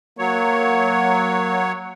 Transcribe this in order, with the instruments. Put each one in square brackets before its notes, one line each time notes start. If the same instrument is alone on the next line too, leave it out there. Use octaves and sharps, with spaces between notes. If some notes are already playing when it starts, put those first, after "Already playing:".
[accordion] F#3 C#5 [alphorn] A#3